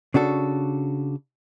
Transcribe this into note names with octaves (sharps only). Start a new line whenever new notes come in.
C#3 D4 F#4 A4